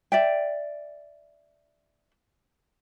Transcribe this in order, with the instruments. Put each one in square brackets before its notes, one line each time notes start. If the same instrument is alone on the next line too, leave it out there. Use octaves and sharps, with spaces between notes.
[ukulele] D5 E5 G5